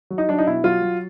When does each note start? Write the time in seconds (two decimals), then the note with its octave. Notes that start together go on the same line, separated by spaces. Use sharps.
0.10 F#3
0.18 D#4
0.28 F#3 D4
0.38 D#4
0.47 B2 E4
0.64 F#3 F4
0.82 F#3